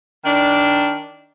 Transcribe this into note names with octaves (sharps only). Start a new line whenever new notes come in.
D#3 D4